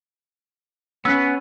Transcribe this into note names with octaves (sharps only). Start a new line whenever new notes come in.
B3 C#4 E6 F#6 B6